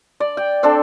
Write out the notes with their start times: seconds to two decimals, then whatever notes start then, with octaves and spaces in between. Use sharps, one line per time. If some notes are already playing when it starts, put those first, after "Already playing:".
0.20 D5
0.37 G5
0.63 C4 D4 A4 A5